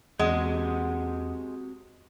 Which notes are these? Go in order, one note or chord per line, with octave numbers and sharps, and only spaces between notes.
E2 G#3 C4 F#4 G4 F#5 D#6